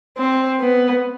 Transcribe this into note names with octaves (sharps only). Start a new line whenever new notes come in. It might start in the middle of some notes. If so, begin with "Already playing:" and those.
C4
B3